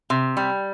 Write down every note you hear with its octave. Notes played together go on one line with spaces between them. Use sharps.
C3
G3